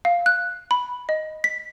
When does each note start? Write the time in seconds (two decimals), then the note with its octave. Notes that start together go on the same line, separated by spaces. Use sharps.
0.05 F5
0.26 F#6
0.71 B5
1.09 D#5
1.44 B6